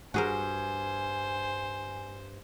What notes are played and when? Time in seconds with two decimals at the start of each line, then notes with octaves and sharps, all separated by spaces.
0.14 G2 F#4 G#4 A#4 C5 G#5